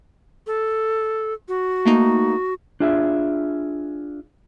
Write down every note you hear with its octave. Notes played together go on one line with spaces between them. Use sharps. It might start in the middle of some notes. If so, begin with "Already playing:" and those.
A4
F#4
A3 A#3 D#4
D4 F4 G#4 E5